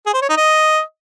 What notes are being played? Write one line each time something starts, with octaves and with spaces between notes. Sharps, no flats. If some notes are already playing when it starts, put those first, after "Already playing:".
G#4
C5
C#5
D#4
D#5